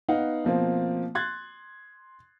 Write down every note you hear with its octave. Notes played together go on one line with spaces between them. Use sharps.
B3 D#4 F5 F#5
B2 F3 A#3 C4
C6 F#6 G#6 A6